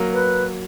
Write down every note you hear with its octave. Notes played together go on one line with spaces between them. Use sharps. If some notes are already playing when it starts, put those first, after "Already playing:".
Already playing: F#3 A#3
B4